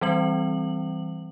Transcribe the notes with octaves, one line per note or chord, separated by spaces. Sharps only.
E3 G3 C4 F#7